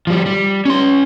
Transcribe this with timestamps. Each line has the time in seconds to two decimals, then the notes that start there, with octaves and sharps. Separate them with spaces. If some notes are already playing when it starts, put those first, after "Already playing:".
0.07 F3 G3
0.26 G3
0.65 C#4 C6